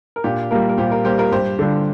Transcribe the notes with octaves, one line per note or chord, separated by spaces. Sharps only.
A#4
A#2 D4 G4
G3 A#3 F4 A#4
A#4
A#2 G4 C5
F4 A#4
G3 A#3 G4 C5
F4 A#4
G2 G4 C5
D3 G3 D4 F4